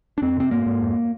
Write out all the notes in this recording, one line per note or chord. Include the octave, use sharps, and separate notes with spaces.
D4
F2 C4
C3 C4
G#2 A#3
G#2
F2